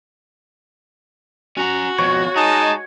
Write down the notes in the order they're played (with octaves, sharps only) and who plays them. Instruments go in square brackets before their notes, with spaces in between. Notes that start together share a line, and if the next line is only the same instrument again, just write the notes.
[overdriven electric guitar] C#4 A#5 [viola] F#4
[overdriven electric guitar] F2 B2 [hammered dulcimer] C#5
[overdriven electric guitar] G#3 G#4 [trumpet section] D#4 A5